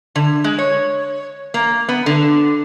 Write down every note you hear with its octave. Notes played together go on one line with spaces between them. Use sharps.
D3
G#3
C#5
A#3
B3
D3